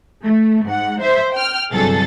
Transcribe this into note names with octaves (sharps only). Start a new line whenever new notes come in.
A3
G#2 F#5
C5 E5
G5 F6
G1 C2 F#3 G#4 A4 A6